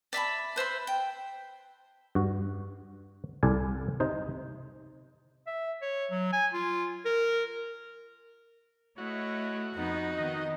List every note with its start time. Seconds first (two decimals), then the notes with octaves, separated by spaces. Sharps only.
0.13 D5 E5 A5 B5
0.56 B4 C5 E5 C6
0.87 G5
2.15 G2 F#4
3.43 C2 A4 D5 G#5
4.00 C3 D#4 C5
5.47 E5
5.82 C#5
6.11 F#3
6.33 G#5
6.54 F4
7.05 A#4
8.98 A3 E4 F#4 C#5 D#5
9.76 F2 B3 D#4
10.17 D#3 B3 D#5